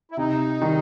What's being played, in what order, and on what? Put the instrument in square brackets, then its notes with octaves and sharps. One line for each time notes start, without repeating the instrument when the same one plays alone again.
[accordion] E4
[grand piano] C3 [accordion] D#4
[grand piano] D#3 G3